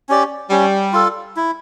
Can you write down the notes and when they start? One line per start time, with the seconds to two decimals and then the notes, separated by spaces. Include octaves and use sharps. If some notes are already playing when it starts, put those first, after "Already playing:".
0.09 C#4 G4 D5
0.50 G3 C#4
0.93 F4 A4
1.36 E4